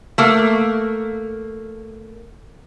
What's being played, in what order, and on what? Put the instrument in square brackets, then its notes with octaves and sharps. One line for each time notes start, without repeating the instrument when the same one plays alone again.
[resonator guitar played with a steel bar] A3 A#3